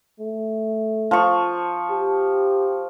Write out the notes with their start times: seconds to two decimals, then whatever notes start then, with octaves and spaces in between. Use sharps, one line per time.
0.20 A3
1.11 F3 C#6
1.90 G4